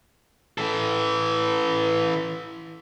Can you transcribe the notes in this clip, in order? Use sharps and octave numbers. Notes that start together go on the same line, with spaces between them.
E3 A4